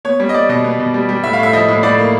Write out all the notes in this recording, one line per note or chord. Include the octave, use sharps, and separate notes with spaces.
B3 C#5
G3 C#5
D#5
G3 D5
B2 D#5
B3
B2
G3
G3
A2 E5
F5
A2 E5
F3 D#5
A2
A2 D5
A#3